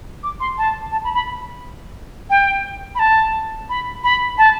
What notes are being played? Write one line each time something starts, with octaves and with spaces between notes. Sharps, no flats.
D6
C6
A5
A5
B5
B5
G5
B5
A5
B5
B5
A5